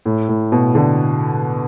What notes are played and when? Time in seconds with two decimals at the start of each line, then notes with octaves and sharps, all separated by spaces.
0.06 A2
0.29 A2
0.52 B2
0.75 D3